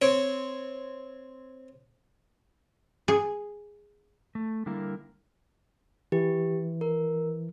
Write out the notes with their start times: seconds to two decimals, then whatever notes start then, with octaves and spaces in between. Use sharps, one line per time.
0.02 C4 C#5
3.08 G#4
4.35 A3
4.66 D3 G3 A#3 E4 A#4
6.12 E3 G4
6.81 A#4